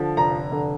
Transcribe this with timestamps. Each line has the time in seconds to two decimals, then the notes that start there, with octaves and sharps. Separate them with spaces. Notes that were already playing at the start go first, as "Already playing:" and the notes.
Already playing: D3 F3
0.17 F1 A#5
0.52 D3